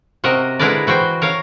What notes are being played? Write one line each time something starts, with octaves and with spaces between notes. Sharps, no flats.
C3 F#4 A#4 D#5
D3 G#3 E4 A#4 B4 D5
E3 F#4 C5 G5
A#4 C#5 F5